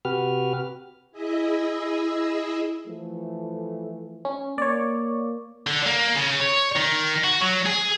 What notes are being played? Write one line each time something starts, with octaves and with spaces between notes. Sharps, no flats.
C3 F#4 G4 B4 F6
E4 G#4 D#5 E5
E3 F3 A3
C#4
A#3 C#5 D5
D3
A#3
C#3
C#5
D#3
F#4
F#3
G#4